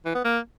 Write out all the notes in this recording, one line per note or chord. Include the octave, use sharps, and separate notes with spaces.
E3
B3
A#3